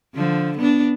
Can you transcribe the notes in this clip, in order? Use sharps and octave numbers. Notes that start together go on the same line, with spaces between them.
D3 F3
B3 D4